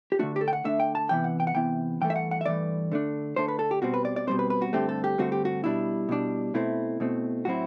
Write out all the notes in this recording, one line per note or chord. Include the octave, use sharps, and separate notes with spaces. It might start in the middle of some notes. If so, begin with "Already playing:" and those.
G4
D3 A3 D4 F#4
G4
A4
G5
F#5
D3 A3 D4 E5
G5
A5
C3 E3 B3 E4 G5
F#5
G5
F#5
C3 E3 B3 E4 G5
G2 E3 A3 G5
E5
F#5
F#5
E5
G2 E3 A3 D5
D3 A3 D4
D3 A3 D4 C5
B4
A4
G4
B2 G3 C4 F#4
B4
D5
D5
B2 G3 C4 C5
B4
B4
F#4
G2 D3 A3 C4 G4
A4
G4
G2 D3 A3 C4 F#4
G4
F#4
B2 G3 D4 E4
B2 G3 D4
B2 A3 C4 E4
B2 A3 C4
A2 F#3 C4 E4 F#4